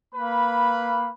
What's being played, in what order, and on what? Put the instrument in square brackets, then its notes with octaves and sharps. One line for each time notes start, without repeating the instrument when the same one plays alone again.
[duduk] A#3 [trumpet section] B4 B5